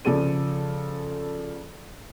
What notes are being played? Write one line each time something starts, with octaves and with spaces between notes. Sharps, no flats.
C#3 F3 A4 D5 D#7